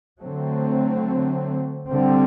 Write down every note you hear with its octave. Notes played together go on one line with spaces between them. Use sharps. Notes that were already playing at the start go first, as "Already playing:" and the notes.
D3 F#3 A3 C4
D3 G3 C4